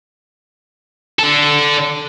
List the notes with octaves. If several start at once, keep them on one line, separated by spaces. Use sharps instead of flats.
D3 A4